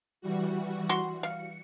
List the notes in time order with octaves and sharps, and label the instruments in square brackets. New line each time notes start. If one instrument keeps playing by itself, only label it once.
[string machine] E3 G3 F#4
[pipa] F#4 C6
[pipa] F5 [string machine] C#7